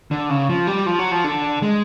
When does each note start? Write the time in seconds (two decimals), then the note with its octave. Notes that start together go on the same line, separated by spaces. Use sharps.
0.11 D3
0.30 C#3
0.49 F3
0.67 G3
0.86 F3
0.99 F#3
1.12 F3
1.24 D3
1.62 G#3